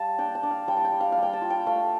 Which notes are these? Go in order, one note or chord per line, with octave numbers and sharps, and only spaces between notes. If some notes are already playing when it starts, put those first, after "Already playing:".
Already playing: G3 F5 A5
D4 G5
A5
D4
F5
G3 G5
A5
G5
G3
F5
F5
G3
G5
A5
F4
G5
A3 F5